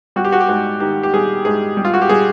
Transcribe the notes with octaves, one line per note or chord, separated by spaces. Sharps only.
G3 F#4
G4
F#4
G4
G#2 F#4
D#3 G4
G4
G3 G#4
G#2 G#4
G3
F4
F#4
G4
G3 G#4